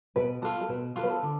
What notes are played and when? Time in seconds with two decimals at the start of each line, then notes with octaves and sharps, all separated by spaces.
0.16 B2 B4
0.42 B3 F4 A4
0.61 A4
0.69 B2 B4
0.96 B3 F4 A4
1.03 B4
1.10 A4
1.23 D3